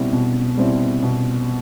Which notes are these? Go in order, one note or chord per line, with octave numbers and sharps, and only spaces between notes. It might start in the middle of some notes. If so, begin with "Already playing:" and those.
Already playing: B2 G3 C4 E4
B2
G3 C4 E4
B2